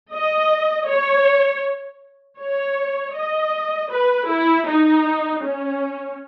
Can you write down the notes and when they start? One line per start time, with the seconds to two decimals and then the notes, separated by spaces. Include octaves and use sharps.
0.13 D#5
0.89 C#5
2.41 C#5
3.16 D#5
3.92 B4
4.30 E4
4.68 D#4
5.44 C#4